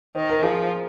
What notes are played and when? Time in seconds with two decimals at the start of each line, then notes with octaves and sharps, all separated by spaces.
0.15 D#3 C5
0.30 A#4
0.43 F3 G#4